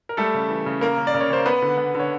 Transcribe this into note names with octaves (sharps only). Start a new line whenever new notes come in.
A#4
G3 A3 A4
C#3
E3
C#3
A#3 A#4
C#3
D5
C#3
C#5
C#3 C5
B3 B4
D3
B3
D3 C#5